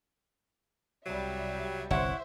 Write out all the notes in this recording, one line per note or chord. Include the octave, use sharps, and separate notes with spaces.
C2 F#3 G3 E5
G1 C2 E4 C5 C#5 E5 F#5